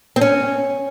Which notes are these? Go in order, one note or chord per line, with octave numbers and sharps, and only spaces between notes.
C4
C#4